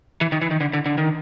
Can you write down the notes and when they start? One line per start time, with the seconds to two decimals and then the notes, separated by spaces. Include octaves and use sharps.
0.21 E3
0.32 D#3
0.42 E3
0.51 D#3
0.61 D3
0.74 D3
0.86 D3
0.98 D#3